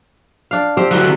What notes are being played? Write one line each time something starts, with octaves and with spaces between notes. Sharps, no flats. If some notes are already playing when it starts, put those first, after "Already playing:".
D4 F5
C4 G4 C5
D3 F#3